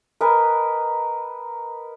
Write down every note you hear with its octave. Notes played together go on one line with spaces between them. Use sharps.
A#4 B4 D#5 G#5